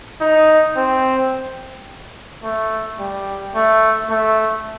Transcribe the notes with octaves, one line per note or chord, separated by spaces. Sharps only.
D#4
C4
A3
G3
A3
A3